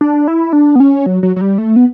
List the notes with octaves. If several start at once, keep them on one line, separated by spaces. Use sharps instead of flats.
D4
E4
D4
B3
C#4
F#3
F#3
F#3
G3
A3
B3